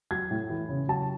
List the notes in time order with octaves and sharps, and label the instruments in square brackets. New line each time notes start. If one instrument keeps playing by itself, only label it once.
[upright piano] F#3 G#6
A2
E3
C#3
F#3 A5